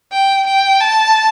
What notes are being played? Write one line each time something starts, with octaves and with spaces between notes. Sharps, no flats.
G5
G5
A5